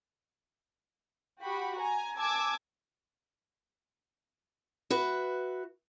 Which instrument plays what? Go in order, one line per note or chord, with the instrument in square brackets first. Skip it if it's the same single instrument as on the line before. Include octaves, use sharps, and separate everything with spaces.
[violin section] F#4 G4 B5
G#5 A#5
G#5 A5 D6 E6 G#6
[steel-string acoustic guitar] F#4 B4 E5